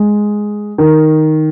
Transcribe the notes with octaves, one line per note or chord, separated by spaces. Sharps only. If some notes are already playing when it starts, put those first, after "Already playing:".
Already playing: G#3
D#3